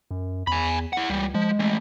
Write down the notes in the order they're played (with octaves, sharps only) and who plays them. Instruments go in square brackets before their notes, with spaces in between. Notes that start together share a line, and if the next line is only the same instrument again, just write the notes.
[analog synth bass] F#2
[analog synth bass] E2 [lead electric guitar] G#5 B5
[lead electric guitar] E4 F#5
[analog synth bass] C#2 [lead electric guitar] E3 G3
[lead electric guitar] F3 [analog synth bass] G#3
[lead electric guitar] E3 A3